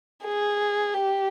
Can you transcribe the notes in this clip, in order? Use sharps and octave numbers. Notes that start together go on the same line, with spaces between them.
G#4
G4